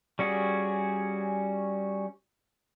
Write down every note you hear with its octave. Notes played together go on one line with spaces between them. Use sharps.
G3 C#4 F#4 G#4